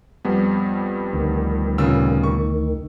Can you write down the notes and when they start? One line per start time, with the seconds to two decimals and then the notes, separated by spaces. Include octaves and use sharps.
0.25 F2 G3 B3
1.13 D2 D#3
1.78 A#2 C#3 E6
2.23 C#6